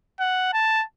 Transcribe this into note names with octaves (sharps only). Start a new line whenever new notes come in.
F#5
A5